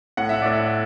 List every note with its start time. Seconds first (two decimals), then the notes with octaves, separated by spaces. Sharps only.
0.17 A2 F#5
0.29 E5
0.42 A2 D5
0.53 E5